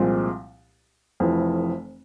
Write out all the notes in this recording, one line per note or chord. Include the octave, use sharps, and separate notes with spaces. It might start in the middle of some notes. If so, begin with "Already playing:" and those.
Already playing: C2 A#2 F3 G#3 C4
F1 F2 E3